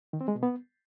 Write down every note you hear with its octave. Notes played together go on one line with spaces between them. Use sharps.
D#3
C4
G#3
B2
B3